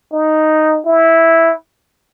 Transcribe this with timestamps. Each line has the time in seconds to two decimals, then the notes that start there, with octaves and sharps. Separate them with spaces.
0.12 D#4
0.86 E4